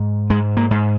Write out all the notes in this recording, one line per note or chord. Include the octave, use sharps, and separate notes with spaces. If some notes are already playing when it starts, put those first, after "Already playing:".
Already playing: G#2
G#2 G#3
A#3
G#2